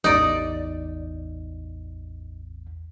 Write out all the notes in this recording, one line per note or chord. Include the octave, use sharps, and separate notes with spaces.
A1 E2 D#4 D5